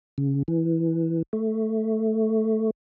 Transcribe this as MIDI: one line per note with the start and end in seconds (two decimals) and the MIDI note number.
0.18 0.43 49
0.48 1.22 52
1.33 2.71 57